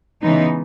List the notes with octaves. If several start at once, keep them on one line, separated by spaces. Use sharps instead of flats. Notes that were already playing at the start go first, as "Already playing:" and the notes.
C#3 E3 G#3 B3 D#4